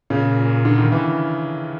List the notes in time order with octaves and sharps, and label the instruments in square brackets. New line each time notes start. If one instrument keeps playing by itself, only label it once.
[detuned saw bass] A#2 [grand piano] C#3
[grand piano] D3
D#3
E3